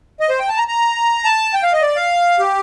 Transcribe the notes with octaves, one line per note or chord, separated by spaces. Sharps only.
D#5
C5
G5
A5
A#5
A#5
A5
G5
F5
D#5
D5
F5
G4